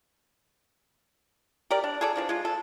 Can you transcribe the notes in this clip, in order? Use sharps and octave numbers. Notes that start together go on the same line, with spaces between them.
G4 A#4 D5
D4
G#4 A4 D5
E3 F3 D4
G#3 F4
A4